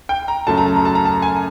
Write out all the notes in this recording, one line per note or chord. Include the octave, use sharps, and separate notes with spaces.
G5
A#5
F#2 C#3 F#3 A3 A5
A#5
A5
A#5
A5
A#5
A5
G#5